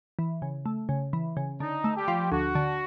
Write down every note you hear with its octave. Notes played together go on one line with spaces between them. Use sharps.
E3
C#3
A3
C#3
E3
C#3
D3 D#4
A3
G3 G4
F3
D2 F#4
D3